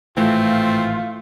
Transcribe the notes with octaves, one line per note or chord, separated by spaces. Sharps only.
G#1 A2 E3 A3 C4 F4